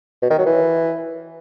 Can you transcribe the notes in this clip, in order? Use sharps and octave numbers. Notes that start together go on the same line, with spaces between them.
B2
D#3
F#3
E3